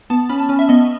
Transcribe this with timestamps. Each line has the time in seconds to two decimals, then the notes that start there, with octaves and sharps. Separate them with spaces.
0.10 B3 A5
0.29 C#4 B5
0.39 A5
0.49 C#4
0.59 E5
0.69 B3 D#5